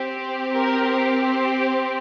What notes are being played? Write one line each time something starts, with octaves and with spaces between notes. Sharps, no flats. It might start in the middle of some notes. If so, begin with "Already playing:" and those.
Already playing: C4 G4
A#4
C5